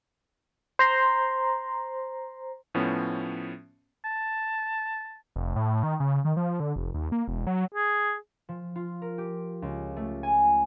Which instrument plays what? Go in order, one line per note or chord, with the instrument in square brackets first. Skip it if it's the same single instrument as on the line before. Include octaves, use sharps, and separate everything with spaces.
[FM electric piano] C5 A#5 C6
[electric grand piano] A2 F3 B3 C#4
[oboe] A5
[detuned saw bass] F1
A2
D#3
C#3
D#3
F3
D3
F1
D#2
A#3
E1
F#3
[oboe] G#4
[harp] F3
F4
A#4
G4
C#2
A3
G#5